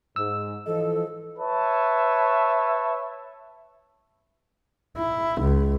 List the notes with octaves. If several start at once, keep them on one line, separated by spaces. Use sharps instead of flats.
G#2 E6
E3 F3 A4 D#5
B4 C#5 E5 A5
E4
C#2